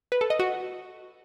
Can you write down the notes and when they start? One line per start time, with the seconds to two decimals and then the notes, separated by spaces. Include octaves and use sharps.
0.12 B4
0.21 A4
0.30 D#5
0.39 F#4